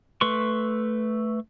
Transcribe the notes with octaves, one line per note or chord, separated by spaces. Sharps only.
A3 B4 C6 C#6